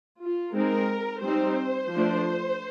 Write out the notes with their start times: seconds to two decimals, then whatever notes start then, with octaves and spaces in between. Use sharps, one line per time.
0.21 F4
0.55 G#3 C4 D#4 A#4
1.24 G3 C4 D#4 C5
1.92 F3 A3 D4